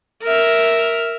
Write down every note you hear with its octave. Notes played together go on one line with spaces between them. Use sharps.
A#4 E5